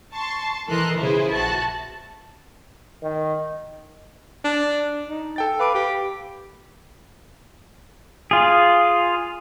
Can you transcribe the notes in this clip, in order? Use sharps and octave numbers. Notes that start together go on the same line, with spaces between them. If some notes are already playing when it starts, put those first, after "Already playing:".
A5 C6 C#6
E3 A4 A#4 D#5 C6 F#6
C#3 E4 F4 G#4 B4 C5
A#1 F#4 E5 A5 F#6
D#3
D4
D#4
A4 G5 A6
B4 F5 D6 D7
G4
F4 G#4